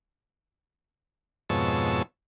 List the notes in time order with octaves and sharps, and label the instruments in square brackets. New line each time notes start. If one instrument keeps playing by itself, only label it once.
[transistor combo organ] F2 G#2 B2 C#5 A5 E6